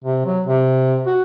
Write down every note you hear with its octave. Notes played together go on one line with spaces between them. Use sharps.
C3
F#3
C3
F#4